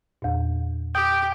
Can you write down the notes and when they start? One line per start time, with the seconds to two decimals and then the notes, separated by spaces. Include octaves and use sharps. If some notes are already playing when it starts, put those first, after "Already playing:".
0.22 E2 A#2
0.95 G4 G5 D#6